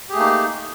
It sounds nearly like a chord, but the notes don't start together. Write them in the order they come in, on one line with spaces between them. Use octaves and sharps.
G4 G#4 A3 A#3 D#4